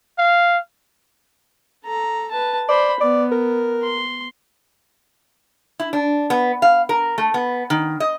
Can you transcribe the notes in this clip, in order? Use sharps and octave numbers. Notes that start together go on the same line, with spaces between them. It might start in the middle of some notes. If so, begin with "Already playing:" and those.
F5
A4 A#5
B4 A5
C5 D5 B5
B3 D5
A#4
C6
E4
D4
B3
F5
A#4
A3
B3
D#3
D#5